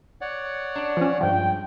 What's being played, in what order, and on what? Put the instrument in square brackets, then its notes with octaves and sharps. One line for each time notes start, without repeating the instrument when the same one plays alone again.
[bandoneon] C#5 D5 F#5
[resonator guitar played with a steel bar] D4
[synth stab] F3 C#4
[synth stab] G2 F3 [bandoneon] G#3 [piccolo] G5